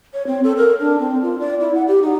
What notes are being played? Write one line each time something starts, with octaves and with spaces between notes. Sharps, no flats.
C#5
C4
A4
A#4
D4
C4
F4
D5
E4
F#5
G4
D#4